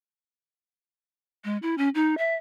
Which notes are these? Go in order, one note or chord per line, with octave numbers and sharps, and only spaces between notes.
G#3
E4
C#4
D#4
E5